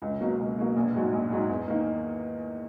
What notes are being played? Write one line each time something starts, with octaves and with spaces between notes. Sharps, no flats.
C#2
B2 F#3 A#3
C#2
B2 F#3 A#3
A#1
G#2 F#3
A#1
G#2 F#3
E2
D#3 A#3